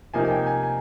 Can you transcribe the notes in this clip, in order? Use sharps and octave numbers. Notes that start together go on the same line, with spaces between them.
C3 F3 A#3 D#4 G#5
G#5
G5
G#5
G#5